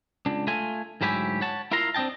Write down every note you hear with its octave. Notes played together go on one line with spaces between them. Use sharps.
C#2 D4
A3 F4 G#5
D2 G#2 F#3 E4 G4 G#5
C#5 F#5 A5
E4 F4 A#4 F5 A#5 C6
C4 D4 D#5 G5 A5